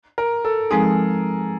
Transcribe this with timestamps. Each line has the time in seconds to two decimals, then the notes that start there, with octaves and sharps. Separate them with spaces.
0.18 A#4
0.45 A4
0.71 F3 G#3 C4 D#4 G#4